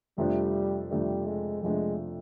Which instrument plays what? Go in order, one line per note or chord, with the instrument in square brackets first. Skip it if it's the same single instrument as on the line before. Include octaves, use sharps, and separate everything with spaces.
[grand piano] F2 C3 F3 A3 D4 [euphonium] G3
[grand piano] F2 C3 F3 A3 D4 [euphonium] G3
[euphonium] G#3
[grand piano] F2 C3 F3 A3 D4 [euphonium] G#3